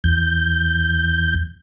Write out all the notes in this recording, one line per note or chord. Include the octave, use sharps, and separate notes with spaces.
E2 G6